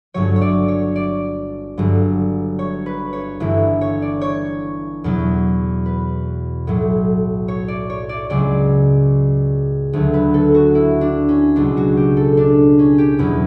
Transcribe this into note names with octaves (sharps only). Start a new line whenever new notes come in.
G1 G2 F#3 C#5
C#5
D5
C#5
D5
G1 G2 F#3
C#5
B4
C#5
G1 G2 E3 E4
C#5
D5
C#5
E2 B2 F#3
B4
B1 A2 F#3
C#5
D5
C#5
D5
C#2 C#3 F#3 D5
D2 D3 F#3
B4
A4
F#4
E4
D4
C#4
C#2 B2 F#3 D4
F#4
G4
A4
D4
C#4
G4
E2 B2 F#3 B4